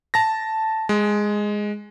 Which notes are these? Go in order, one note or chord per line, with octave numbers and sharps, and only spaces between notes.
A5 A#6
G#3